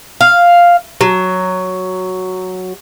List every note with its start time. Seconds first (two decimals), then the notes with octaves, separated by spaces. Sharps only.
0.21 F5
1.01 F#3